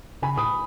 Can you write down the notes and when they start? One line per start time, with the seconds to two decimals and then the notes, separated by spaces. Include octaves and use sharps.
0.22 C#3 G#5 B5
0.37 A2 B5 D#6